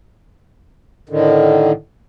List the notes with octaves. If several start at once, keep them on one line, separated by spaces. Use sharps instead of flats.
A2 D3 D#3